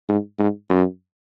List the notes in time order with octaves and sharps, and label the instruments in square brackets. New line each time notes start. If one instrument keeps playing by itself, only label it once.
[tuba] G#2
G#2
F#2